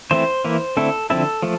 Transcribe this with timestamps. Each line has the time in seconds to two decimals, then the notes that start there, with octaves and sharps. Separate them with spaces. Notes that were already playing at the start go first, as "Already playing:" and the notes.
0.11 E3 A3 C4 E4 C5
0.45 E3 A#3 E4
0.77 D3 A3 C4 E4 A4
1.10 D3 F3 C4 E4 A4
1.42 F3 A3